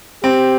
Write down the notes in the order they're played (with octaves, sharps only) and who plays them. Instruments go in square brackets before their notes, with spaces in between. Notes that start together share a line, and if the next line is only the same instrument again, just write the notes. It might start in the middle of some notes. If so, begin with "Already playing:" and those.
[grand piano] C4 [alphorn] G4